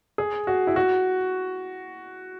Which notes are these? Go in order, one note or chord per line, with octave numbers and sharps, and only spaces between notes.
G#4
F#4
E4
F#4